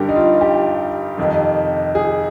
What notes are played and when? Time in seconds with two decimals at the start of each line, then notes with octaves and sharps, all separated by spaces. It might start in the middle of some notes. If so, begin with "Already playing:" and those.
Already playing: G2 D3 G4 A#4
0.09 D#4
0.16 F4
0.41 G4
1.18 F2 C3 D#3
1.95 G#4